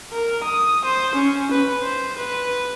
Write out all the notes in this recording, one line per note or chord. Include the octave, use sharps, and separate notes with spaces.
A#4
D#6
C5
C#4
B4
C5
B4